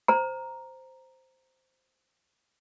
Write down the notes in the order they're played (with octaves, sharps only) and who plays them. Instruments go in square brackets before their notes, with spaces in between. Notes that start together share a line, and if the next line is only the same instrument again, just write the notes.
[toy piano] C5 A#5